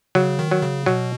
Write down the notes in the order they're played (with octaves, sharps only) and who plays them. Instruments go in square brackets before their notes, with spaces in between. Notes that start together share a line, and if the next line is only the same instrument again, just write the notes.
[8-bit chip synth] C#3 [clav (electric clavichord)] F#3
[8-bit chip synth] D#3
[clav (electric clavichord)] F#3
[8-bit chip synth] C#3
[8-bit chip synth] B2 [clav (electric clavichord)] F#3